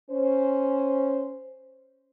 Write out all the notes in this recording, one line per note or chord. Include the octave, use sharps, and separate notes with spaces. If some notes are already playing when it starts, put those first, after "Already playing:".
C#4 C5